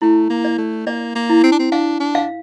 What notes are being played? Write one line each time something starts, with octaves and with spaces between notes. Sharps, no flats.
A3 E4
A#3
D5
A3
A#3 D5
A#3
E4
C4
D4
C4
D4 F5
D4
F5